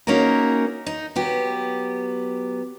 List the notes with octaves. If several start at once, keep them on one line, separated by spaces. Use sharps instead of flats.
A#3 C#4 D#4 F#4 G#4 A#4
D#4
F#3 B3 G4